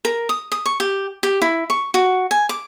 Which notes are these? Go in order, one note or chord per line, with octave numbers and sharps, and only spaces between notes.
A#4
D#6
D#6
C#6
G4
G4
E4
C#6
F#4
G#5
D6